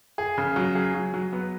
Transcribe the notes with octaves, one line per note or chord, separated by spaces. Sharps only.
G#4
C#3
F#3
G#4
F#3
F#3
B3